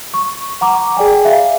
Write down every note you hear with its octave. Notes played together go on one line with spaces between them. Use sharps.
C#6
F#5 A#5 D6
G#4 D5 G5 G#5
E5 F5